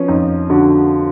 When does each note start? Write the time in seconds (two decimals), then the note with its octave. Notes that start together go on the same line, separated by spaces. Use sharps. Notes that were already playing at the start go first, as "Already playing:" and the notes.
Already playing: F3 B3 C#4
0.08 F2 D#4
0.50 D3 F#4